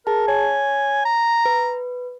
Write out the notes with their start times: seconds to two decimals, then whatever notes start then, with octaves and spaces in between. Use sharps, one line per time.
0.07 G#4 A#4 A5
0.28 C#5 G#5
1.05 A#5
1.45 B4